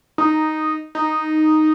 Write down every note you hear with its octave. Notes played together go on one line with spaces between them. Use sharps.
D#4
D#4